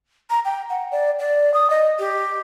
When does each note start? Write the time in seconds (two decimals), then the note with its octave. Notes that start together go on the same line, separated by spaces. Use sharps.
0.30 A#5
0.45 G5
0.70 F#5
0.92 D5
1.19 D5
1.54 D#6
1.70 D#5
1.99 G4